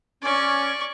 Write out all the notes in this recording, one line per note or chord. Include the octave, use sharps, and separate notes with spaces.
C#4 D5 C#6